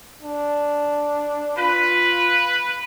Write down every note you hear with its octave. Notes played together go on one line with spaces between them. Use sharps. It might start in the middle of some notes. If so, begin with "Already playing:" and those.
D4
F4 B4